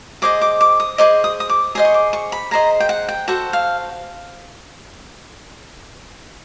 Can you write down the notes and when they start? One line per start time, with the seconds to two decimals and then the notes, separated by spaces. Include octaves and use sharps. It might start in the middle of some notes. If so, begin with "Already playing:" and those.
0.22 G#4 C5 D#5 D6
0.41 D6
0.61 D6
0.80 D#6
0.98 G#4 C5 D#5 D6
1.24 D#6
1.40 D#6
1.49 D6
1.75 G#4 C5 D#5 D#6
1.85 C#6
1.94 D6
2.13 C#6
2.32 B5
2.51 G#4 C5 D#5 A#5
2.80 G5
2.89 F#5
3.09 G5
3.28 F#4 A4 C5 F#5
3.53 F5